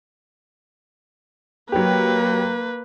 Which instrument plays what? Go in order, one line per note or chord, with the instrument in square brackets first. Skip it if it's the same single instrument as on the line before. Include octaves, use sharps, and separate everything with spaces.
[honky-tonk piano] F#3 G4 [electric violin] A#3 B4